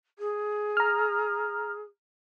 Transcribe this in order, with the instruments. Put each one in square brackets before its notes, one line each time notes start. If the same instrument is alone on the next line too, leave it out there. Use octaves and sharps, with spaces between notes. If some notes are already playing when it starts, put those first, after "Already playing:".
[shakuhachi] G#4
[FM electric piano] A#5 F6